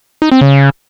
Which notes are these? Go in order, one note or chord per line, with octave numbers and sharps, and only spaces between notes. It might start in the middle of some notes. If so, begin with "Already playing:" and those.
D#4
C4
C#3